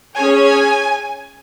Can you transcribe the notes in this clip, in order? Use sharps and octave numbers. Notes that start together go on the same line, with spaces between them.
C#4 G#4 C#5 G#5